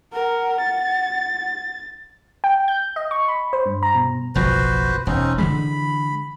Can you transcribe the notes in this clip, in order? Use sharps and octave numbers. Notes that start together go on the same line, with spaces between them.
A#4 F#5
A6
G5
G6
D#5
C#6
B5
C5
G2
A#5
B2
F#1 B1 F3 F#4 B4 C5
E1 C4 C#4 D#4
D3 E3 G#3 B5